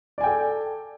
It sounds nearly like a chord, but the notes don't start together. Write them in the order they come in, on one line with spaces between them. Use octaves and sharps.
D5 G#5 G5 A4